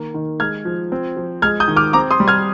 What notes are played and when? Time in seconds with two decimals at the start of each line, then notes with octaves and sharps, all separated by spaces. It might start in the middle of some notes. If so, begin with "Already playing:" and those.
Already playing: D#3 A#3
0.14 D#3
0.40 G#3 F6 G#6
0.65 F3
0.92 C4
1.17 F3
1.42 G#3 F6 G#6
1.60 D#6 G6
1.68 D#3
1.76 D6 F6
1.93 C4 A#5 D6
2.11 C6 D#6
2.20 G3
2.28 F6 G#6